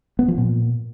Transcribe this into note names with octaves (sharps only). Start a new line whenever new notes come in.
B3
F3
A#2